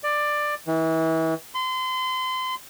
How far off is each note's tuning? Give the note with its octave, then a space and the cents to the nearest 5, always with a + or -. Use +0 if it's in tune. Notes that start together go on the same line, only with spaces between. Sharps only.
D5 +15
E3 -30
C6 -30